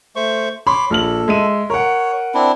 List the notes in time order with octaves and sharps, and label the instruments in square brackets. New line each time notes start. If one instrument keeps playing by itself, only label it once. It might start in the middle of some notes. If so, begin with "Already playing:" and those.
[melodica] A3 C5 C#6
[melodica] C#5 D6 [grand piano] B5 C6
[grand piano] A#1 F6 F#7 [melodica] A4
[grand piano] G#3 E5 D#7
[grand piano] A#4 F#5 [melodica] C#5
[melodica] C4 D4 E4